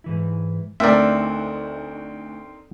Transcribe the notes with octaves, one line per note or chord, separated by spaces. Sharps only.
G#2 E3 E4
D2 C4 D4 D#4 A#4 D5 E5